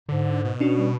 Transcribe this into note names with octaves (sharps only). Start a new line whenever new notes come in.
G#2 D3
B2
C#4 D4 F#4
G3